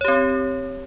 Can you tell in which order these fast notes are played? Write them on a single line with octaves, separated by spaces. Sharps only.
C#5 G4 C4